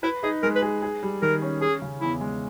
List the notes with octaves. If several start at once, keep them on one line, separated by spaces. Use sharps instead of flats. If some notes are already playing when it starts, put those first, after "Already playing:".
E4 B4
D#4 G#4
G#3 A#4
B4
G#4
G#4
G3
D#3 A#4
C#4
C#4 G#4
C#3
E2 E4
G#3